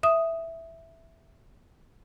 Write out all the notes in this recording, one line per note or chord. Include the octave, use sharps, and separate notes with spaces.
E5 D#6